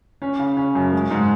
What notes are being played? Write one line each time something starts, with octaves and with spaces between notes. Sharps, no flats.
C#4
C#3
C#4
F#2
G#3
G#2